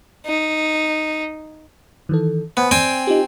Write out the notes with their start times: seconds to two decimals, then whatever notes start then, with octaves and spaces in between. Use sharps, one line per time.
0.26 D#4
2.09 D#3 E3 A4
2.57 B3 C5 F#5 G#5
2.71 C4 D5 G5 G#5
3.07 D#4 F4 G4